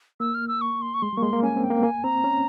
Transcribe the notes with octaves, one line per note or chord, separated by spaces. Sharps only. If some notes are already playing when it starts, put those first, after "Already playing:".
A#3 E6
F6
E6
C#6
C6
C#6
G#3 C6
G3
A#3 C#6
G#3 C6
A#3
C#4 G#5
C4
G5
A#3
A#3 G#5
C4 A#5
C#4